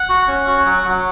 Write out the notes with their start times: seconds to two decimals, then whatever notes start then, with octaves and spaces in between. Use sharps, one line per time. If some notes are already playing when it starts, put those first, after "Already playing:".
Already playing: F#5
0.09 F#4
0.28 C#4
0.47 F#4
0.65 F#3
0.84 F#3